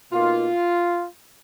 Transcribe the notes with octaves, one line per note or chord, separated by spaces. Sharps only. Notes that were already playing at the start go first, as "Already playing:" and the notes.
B2 A#3 D#4 F4